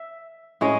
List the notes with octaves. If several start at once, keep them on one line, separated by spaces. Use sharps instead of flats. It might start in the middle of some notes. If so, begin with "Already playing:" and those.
Already playing: E5
A2 G#3 C#4 D#5